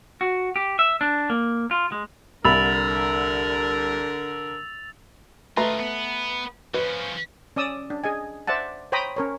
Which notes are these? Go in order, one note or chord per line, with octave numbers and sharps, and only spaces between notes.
F#4
G4
E5
D4
A#3
F4
G#3
C2 D3 A#4 B5 E6 A6 F7
A3 F4 G#4 B4 A#5
B3
F3 C#4 B4
C#4 D5 D#6 E6
D4
G#4 D#5 G#5
C5 D5 E5 F#5 A5
C5 C#5 G5 A#5 B5 D#6
C#4 A#4 C#5